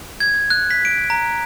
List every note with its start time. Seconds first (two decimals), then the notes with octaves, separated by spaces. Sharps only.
0.20 G#6
0.50 F#6
0.71 B6
0.85 D7
1.10 A#5